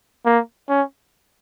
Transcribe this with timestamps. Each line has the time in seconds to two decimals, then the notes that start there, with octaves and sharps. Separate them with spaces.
0.26 A#3
0.69 C#4